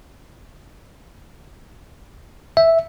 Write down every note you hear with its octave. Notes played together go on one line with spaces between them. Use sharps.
E5